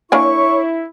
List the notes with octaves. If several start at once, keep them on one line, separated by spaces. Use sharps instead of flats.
A#3 D4 E4 C#5 G#5 C#6